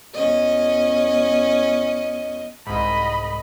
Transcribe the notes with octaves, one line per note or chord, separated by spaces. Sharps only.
E2 C#4 D#5
C2 G#2 D#5 B5